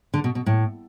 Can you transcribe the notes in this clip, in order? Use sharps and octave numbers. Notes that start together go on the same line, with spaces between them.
D3
B2
B2
A2